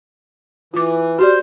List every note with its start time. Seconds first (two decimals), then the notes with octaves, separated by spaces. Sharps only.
0.74 E3 F4 D6
1.19 F#4 G4 C5 D5